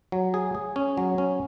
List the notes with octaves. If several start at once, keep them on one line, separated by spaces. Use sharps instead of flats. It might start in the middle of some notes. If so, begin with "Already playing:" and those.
F#3
G#4
G#4
C#4
F#3
C#4